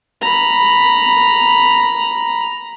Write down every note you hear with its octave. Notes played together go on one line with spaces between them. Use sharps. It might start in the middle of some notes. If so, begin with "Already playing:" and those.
A#5 B5